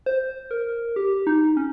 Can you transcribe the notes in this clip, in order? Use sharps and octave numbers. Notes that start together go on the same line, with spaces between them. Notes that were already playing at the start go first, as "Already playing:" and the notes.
C5
A#4
G4
D#4
C#4